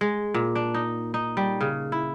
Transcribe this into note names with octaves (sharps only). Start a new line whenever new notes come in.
G#3
A#2
D4
D#4
D#4
G3
C#3
E4